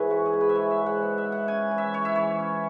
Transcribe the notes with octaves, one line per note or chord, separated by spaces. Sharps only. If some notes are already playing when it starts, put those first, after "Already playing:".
Already playing: G#2 E3 E4 G#4 B4 C#5 E5 F#5
G#3 F#4
G#4
G#2
B4
E5
G#3 C#5
E5
G#2
F#5
B3
E5
E4
F#5
C#4 G#5
E3
E5
E4 C#5
E5
E3 C#5
C#4